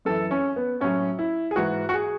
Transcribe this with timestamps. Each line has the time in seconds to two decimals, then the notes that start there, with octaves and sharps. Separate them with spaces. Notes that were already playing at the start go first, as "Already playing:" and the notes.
0.05 F#2 E3 A4
0.31 C#4
0.56 B3
0.80 A2 F#3 C#4
1.19 E4
1.51 G#4
1.56 G#2 E3 F#4
1.89 F#4
1.94 G#4